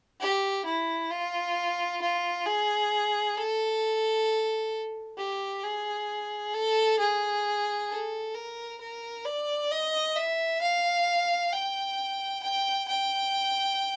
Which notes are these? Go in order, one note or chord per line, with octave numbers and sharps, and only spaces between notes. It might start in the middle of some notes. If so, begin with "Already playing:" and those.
G4
E4
F4
F4
G#4
A4
G4
G#4
A4
G#4
A4
A#4
A#4
D5
D#5
E5
F5
G5
G5
G5